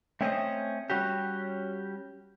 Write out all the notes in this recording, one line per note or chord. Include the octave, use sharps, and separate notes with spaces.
A3 C4 C#4 C5 C#5 D#5
G3 C#4 F#4 G4